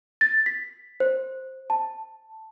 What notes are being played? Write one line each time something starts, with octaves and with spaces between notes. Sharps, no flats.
A6
B6
C5
A5